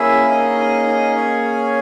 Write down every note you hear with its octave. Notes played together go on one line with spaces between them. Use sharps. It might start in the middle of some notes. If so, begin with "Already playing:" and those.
Already playing: A#3 C#4 E4 G#4 E5
D#4 D#5
D#4 D#5
D#4 D#5
C#4 C#5